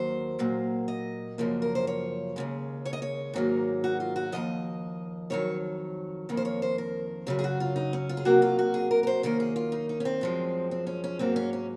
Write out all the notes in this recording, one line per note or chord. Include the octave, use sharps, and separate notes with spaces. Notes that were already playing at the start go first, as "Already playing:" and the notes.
Already playing: D#2 D#3 F#3 A#3 C5
A#2 F#3 A#3
D#5
F#2 C#3 F3 A#3
A#4
C5
C#5
D#2 C#3 G#3
C#5
D#5
C#5
G#2 D#3 F#3 A#3
F#4
F4
F#4
D#2 C#3 F3 D#5
F2 D#3 F#3 C#5
F2 D#3 A#3
C5
C#5
C5
A#4
F#2 C#3 F#3 G#4
G#4
F#4
F4
D#4
C#4
F4
G#4
C3 F#3 A#3 F#4
F4
F#4
G#4
A#4
A#4
C5
F#2 D#3 A#3 A#4
G#4
F4
D#4
D#4
C#4
C4
F#2 F3 G#3
C4
C#4
C#4
G#2 F#3 A#3 C4
C#4
C#4